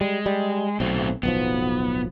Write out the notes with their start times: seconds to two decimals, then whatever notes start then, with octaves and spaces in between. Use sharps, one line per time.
0.01 G3 G#3
0.26 G3
0.80 B1 F#3 A3 C4
1.23 D1 B1 F3 B3